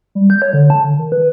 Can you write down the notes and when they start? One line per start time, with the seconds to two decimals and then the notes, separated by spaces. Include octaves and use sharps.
0.15 G3
0.30 G6
0.42 C#5
0.53 D3
0.70 A5
0.84 D3
0.98 D#3
1.12 B4